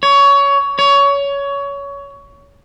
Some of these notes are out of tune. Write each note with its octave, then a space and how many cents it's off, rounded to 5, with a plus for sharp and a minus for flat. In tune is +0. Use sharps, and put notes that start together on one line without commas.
C#5 +20
C#5 +20